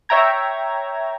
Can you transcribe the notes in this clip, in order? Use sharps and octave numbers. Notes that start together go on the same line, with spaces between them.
C#5 E5 G5 A#5 G#6